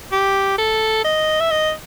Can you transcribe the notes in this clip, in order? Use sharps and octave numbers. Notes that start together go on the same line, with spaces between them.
G4
A4
D#5
E5
D#5